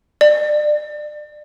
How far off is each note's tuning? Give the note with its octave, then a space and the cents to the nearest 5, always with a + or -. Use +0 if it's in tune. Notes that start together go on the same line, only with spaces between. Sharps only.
D5 +30